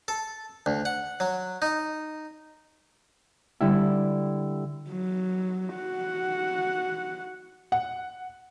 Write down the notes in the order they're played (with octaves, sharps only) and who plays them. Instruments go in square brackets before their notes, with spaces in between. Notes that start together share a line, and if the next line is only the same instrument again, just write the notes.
[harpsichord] A4
D2
F#5
F#3
D#4
[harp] D3 G3 E4
[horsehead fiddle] F#3
F#4 F#5
[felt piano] F#5